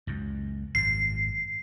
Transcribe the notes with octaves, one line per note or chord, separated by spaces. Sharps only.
C#2 F#2
G#1 F#2 C7